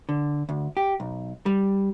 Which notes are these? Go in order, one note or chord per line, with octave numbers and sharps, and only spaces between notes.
D3
D2
G4
B1
G3